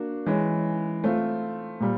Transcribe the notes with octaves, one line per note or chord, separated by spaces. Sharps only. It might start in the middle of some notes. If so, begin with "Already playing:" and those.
Already playing: A#3 D4 F#4
E3 G#3 C#4
A3 C4 F4
A#2 G3